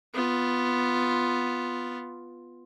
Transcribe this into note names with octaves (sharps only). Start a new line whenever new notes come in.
B3 F4